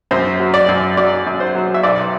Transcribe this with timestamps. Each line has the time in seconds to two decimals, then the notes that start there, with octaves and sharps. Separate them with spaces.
0.11 F#2 C5
0.40 F#3
0.54 D5
0.68 F#2
0.97 F#3 D5
1.26 F#2
1.40 C5
1.55 F#3
1.74 E5
1.83 B1 D5